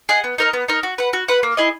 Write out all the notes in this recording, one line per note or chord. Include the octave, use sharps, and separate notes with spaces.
G#4 D#5 F#5
B3
D#4 A#4 D#5
B3
D#4 A#4 D#5
F#4
B4 F#5
F#4
B4 F#5
A#3
E4 G#4 D#5